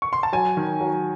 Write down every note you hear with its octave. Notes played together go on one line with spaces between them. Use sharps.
C#6
C6
A5
F#3 G#5
D#3
F#3